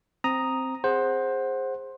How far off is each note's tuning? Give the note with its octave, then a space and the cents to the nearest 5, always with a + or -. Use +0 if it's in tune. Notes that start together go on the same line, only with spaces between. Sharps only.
C4 +0 A#5 +0 D#6 +0
G#4 -15 C5 +15 F#5 +0